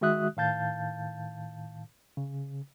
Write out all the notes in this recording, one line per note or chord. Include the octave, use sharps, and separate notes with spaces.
D#3 G#3 F#4 E5 D#6 F#6
A2 D#3 F5 A5 G6 A6
C#3